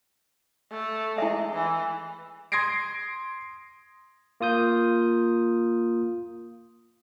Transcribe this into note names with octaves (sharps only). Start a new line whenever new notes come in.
A3
G#3 E4 E5
E3
C6 D#6 G#6 A#6 C7 D7
A#3 F4 D#6 G6